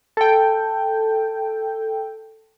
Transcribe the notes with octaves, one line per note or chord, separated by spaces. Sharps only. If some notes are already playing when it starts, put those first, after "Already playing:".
A4 G5